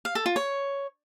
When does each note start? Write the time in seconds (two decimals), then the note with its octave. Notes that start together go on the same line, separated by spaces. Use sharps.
0.05 F5
0.15 A4
0.26 F4
0.36 C#5